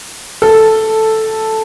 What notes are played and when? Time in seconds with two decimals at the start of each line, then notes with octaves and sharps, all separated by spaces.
0.42 A4